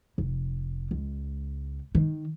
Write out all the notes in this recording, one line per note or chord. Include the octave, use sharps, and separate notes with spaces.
F1
C#2
D#3